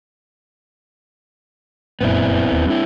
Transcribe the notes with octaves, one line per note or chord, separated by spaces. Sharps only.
F1 F#2 A#2 B3 C4 E4
E1 D#2
G2 C4 D4 E4